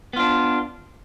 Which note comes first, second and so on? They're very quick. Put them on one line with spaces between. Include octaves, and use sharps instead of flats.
B3 F4 D4